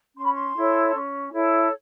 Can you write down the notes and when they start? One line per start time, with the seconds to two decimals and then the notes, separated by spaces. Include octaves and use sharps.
0.16 C#4 C6
0.25 B5
0.32 C6
0.56 E4 A4 C#5
0.94 C#4
1.32 E4 A4 C#5